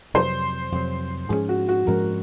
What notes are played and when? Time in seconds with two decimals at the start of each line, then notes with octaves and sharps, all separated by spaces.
0.14 F2 C3 F#3 C5
0.72 F2 C3 F#3
1.29 G#2 F3 G#3 C#4 G#4
1.49 F#4
1.69 F#4
1.87 G#2 F3 G#3 C#4 A#4